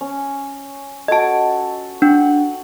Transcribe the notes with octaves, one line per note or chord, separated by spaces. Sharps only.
C#4
F#4 A4 D#5 A5
D4 F#5